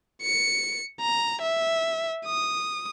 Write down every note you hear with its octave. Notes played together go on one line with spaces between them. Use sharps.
C#7
A#5
E5
D#6